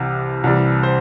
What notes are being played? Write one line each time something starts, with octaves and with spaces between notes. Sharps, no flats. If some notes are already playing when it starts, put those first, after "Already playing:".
Already playing: C2 C3 E3
C2 C3 E3 G3
C5